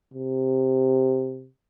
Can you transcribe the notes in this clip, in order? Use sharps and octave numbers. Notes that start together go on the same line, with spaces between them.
C3